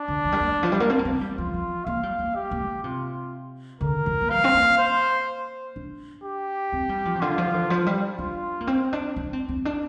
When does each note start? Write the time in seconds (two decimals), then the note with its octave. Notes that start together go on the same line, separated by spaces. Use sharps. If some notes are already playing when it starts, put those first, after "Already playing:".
Already playing: D4
0.08 D3
0.25 F3
0.32 G3
0.41 A#3
0.54 D3
0.63 F3
0.72 G3
0.80 A#3
0.90 C4
0.99 A#3
1.05 C4
1.21 G3
1.38 F3 F4
1.54 F3
1.86 A#3 F5
2.03 G3
2.19 A#3
2.35 G4
2.51 A#3
2.68 D3
2.84 C3 F4
3.81 D3 A#4
4.06 F3
4.21 A#3
4.30 G3 F5
4.44 C4
4.54 A#3
4.78 C5
5.76 D4
6.24 G4
6.72 C4
6.89 G3
7.05 F3
7.15 C3
7.21 D3 F4
7.38 F3
7.54 D3
7.70 F3
7.86 G3
8.18 D4 F4
8.61 A#3
8.67 C4
8.93 D4
9.16 D4
9.33 C4
9.49 C4
9.65 D4